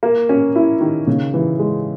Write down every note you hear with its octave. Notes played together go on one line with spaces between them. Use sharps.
A#3
C#4
E4
D#3
C#3
E3
G#3